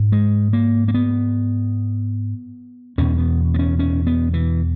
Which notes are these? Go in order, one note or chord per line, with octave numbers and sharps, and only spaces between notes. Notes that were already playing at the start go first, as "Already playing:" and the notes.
Already playing: G#2
G#3
A#3
A#3
B3
E2 B2 C#4
B3
B3
C#4
C#4
B3
E3